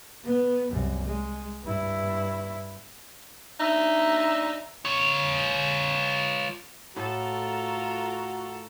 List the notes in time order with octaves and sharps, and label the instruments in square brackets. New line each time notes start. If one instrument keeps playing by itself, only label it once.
[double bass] B3
C2 F#2
G#3
G2 E4
[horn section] D4 E5 [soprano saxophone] D#4
[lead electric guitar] F4 C#5
[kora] A2 [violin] F4 A#4 [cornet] F#4 [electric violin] A4